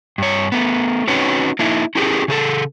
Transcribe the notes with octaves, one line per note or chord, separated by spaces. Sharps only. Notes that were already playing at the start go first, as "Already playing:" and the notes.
G2 C#5
A3 B3
C4 C#4 D#4 F#4 B4 C#5
A#3 D#4 E4
C#4 E4 G4 G#4 A#4
C#3 G#4 A4